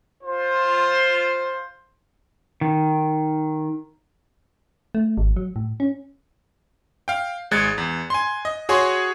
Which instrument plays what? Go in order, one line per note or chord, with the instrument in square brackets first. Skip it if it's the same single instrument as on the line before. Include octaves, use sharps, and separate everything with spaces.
[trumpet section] F4 C5
[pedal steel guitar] D#3
[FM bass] A3
G#1
F#3
A2
C#4
[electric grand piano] F5 G5
G#1 G#3 F#6 G#6 A6 C#7
E2
G#5 C6
D#5
F#4 G#4 C#5 G#5 C6 C#6